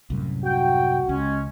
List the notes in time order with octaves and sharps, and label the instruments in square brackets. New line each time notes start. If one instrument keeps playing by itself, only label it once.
[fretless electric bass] C2 F#2 A2
[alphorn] F#4 [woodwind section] G5
[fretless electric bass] C#2 [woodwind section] G#3 C#4